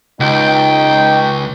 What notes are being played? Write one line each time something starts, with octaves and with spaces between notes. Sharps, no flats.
C#2 D#4 G5